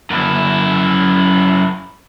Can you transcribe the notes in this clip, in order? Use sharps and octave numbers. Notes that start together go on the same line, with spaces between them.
F#2 E4